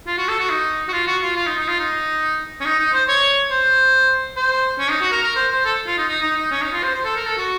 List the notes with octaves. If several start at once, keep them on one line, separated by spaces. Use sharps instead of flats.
F4
F#4
A4
F#4
D#4
F#4
F4
F#4
F4
F4
D#4
D#4
F4
D#4
C#4
D#4
D#4
C5
C#5
C5
C5
C#4
D#4
F#4
A#4
A#4
C5
C5
A4
F4
D#4
D#4
D#4
D#4
C#4
D#4
F4
C5
C5
A4
A#4
A4
F#4